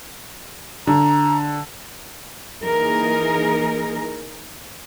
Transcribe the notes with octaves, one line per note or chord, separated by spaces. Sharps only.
D3 A#5
E3 A#3 D#4 G#4 A#4